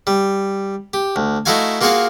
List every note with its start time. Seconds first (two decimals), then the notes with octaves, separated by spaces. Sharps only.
0.07 G3
0.94 G4
1.16 D2
1.46 A3 D#4 E4 F#4 F5 G#5
1.81 A#3 F4 F#4 G#4 F5 F#5